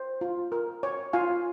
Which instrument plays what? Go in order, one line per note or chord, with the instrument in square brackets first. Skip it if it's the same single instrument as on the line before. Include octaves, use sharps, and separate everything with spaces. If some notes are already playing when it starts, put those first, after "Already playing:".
Already playing: [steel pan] C5
F4
A#4
C#5
F4 F5 G#5